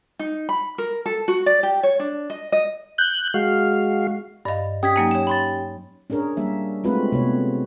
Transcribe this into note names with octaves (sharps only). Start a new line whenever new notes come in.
D#4
B5
A#4
A4
F#4
D5
G4
C#5
D4
D#5
D#5
F#6 G6
G#3 F#4 F5
G2 D5 D#5 F5
C#4 G4 G5 D#6 G#6 B6
F#3 A#3 D#4 G#5
C#5 E7
B5 C6 A6
C#4 D4 G#4 A#4 C#5
G3 A#3 E5
G#3 A3 C4 F4 F#4 B4
C3 B3 C#5